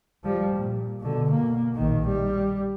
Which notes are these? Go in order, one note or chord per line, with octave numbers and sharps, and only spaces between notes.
F3 G3
A#2
B2 D3
B2 A#3
A#1 D#3
G3